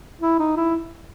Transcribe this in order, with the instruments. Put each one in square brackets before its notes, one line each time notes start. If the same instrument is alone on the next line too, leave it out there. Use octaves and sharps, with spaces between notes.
[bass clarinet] E4
D#4
E4